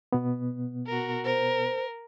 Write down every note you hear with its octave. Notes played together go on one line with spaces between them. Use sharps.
B2 B3
F#4 A#4
A#4 C5